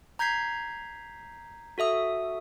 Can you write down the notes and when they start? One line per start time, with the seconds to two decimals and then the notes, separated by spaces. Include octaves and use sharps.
0.19 A#5 G6 G#6 B6 C7
1.78 F#4 A4 E5 D#6